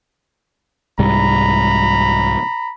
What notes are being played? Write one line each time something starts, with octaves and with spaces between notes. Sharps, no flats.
C2 G#2 G3 A#5 B5